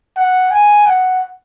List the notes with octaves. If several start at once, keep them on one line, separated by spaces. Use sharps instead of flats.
F#5
G#5
F#5